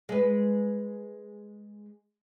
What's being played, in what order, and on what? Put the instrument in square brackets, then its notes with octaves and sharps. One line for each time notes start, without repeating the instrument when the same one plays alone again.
[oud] G#3 B4